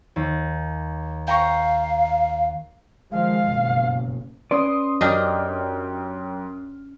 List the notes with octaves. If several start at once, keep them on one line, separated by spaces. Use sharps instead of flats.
D#2
F5 G5 A#5 C#6
D#3 F3 G#3 F5
F#1 G2 B2
C#4 B4 D5 C6 D#6
F#2 D4 G4 D#5 G5 F6